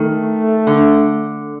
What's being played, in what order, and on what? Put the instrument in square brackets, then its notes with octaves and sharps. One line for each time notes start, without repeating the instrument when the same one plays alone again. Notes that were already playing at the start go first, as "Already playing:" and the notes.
Already playing: [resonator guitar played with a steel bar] D#3 [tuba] A3
[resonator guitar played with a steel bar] D3